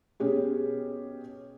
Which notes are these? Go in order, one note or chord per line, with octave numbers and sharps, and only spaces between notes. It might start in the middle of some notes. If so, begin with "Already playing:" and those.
B2 C#4 G4 G#4